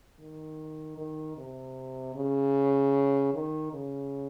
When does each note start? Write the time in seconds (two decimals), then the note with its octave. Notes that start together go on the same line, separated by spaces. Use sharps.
0.19 D#3
0.98 D#3
1.37 C3
2.16 C#3
3.34 D#3
3.72 C#3